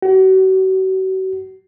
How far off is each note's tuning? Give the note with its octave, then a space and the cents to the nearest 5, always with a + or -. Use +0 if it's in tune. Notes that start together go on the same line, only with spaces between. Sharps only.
F#4 +40